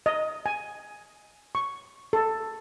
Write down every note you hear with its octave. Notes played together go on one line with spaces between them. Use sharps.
D#5
G#5
C#6
A4